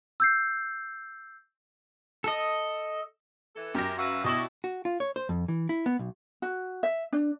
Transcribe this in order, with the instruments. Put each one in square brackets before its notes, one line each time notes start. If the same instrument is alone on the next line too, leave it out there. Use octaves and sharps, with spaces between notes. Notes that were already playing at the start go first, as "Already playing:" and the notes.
[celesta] E6 G6 C7
[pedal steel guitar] A4 D#5
[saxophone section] E3 A4
[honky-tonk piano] F#2 A#6 [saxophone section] G4 A#4
[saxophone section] F#4 B4 F5 [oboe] E5
[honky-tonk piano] B2 C#6 F#7 [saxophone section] G3 D4 E4 [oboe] D#5
[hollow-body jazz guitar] F#4
F4
C#5
C5
F2
E3
E4
B3
B1
[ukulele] F#4
E5
D4